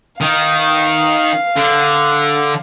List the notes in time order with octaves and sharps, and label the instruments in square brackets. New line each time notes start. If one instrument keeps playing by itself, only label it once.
[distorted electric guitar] D#3 [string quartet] F5
[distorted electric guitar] D3